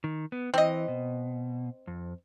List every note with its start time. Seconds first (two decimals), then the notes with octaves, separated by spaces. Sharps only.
0.04 D#3
0.32 B3
0.54 E3 C4 D#5
0.88 B2
1.87 F2